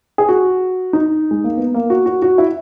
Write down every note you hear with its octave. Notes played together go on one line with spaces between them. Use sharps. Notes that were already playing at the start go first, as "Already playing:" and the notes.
G#4
F#4
D#4
G#3
A#3
B3
A#3
F#4
F#4
F#4
E4